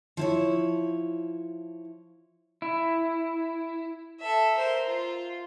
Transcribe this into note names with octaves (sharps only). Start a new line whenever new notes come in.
F3 E4 C#5
E4
A4 E5
A#4 C5
F4